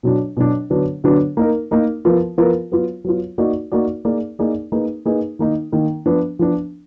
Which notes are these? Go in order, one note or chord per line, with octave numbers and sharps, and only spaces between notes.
B2 F#3 D4
B2 F#3 D4
D3 F#3 B3 D4
D3 F#3 B3 D4
A#3 D#4 A#4
A#3 D#4 A#4
F3 B3 F4 A#4
F3 B3 F4 A#4
F#3 B3 F4
F#3 B3 F4
A#3 D#4 F#4 D5
A#3 D#4 F#4 D5
A#3 D#4 G#4 D5
A#3 D#4 G#4 D5
A#3 D#4 G#4 B4
A#3 D#4 G#4 B4
D#3 A#3 D#4
D#3 A#3 D#4
F3 B3 D4
F3 B3 D4